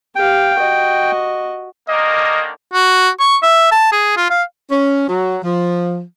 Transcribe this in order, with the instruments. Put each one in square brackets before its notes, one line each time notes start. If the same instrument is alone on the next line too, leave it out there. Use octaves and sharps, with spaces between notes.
[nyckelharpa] G4 F5 [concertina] G5
[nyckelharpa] F#4 D#5
[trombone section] D3 D#3 A#3 [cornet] D#5
[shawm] F#4
C#6
E5
A5
G#4
F4
F5
[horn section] C#4
F#3
F3